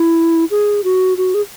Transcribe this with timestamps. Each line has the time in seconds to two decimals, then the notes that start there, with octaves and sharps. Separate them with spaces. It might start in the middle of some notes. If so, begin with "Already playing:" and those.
Already playing: E4
0.51 G#4
0.84 F#4
1.17 F#4
1.34 G#4